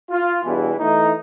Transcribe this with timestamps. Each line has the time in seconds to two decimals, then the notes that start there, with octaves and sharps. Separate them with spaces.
0.10 F4
0.45 E2 G2 B2 E3
0.80 E3 A3 D#4